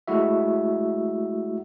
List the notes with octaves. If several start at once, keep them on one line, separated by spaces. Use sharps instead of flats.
G#3 A3 E4 F#4 E5